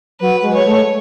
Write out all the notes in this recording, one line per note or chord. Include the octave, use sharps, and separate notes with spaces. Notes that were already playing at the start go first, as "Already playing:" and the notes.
F#3 B4
G#3
C#5
A3